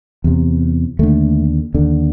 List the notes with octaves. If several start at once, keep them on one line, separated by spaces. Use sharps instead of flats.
E2 C3
D#2 D3 A3
D#2 D3